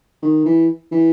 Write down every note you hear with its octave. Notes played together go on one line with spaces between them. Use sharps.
D#3
E3
E3